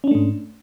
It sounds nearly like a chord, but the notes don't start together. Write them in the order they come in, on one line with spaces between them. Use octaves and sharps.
C#4 D4 A3 G#2